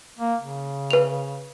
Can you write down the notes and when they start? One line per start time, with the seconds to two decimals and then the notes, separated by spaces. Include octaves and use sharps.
0.19 A#3
0.41 C#3
0.91 B4 F7